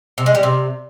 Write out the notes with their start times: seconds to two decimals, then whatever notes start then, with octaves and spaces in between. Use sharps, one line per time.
0.18 C3
0.26 G#3
0.35 G3
0.43 C3